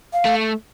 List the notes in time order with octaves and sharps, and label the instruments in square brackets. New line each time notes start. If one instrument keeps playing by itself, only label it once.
[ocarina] F5
[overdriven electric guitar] A3